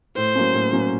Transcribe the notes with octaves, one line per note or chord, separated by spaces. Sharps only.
A2 C5
F#3 A#3 C#4
A2
F#3 A#3 C#4